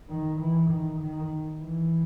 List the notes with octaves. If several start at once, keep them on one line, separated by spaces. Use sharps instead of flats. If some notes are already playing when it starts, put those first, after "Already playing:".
D#3
E3
D#3
D#3
E3